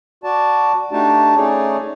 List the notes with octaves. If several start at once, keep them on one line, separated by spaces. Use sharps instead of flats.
F#4 D5 A5
A3 D4 D#4 F#4 G4 A5
A3 C#4 D#4 G#4 C#5 D5